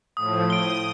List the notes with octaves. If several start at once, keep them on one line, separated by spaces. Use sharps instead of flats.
A2 F3 D#6
D#6 D7 G7